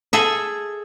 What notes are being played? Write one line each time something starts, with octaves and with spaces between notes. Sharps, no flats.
G#4 A4 E5